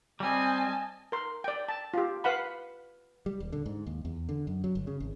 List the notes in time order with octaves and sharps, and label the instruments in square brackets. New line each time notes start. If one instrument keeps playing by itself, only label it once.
[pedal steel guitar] G3 C4 [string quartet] D#5 G#5 A5
[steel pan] A#4 C6
D5 G5
A5
F4 G4
B4 F5 F#5 B5
[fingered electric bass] G3
D#1
D3
G#2
D#2
E2
D3
F#2
F#3
G1
C#3
G#1